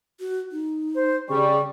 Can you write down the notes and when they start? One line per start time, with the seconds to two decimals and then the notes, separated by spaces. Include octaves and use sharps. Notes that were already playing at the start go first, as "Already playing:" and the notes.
0.20 F#4
0.52 D#4
0.95 C5
1.29 C#3 G3 D5 C#6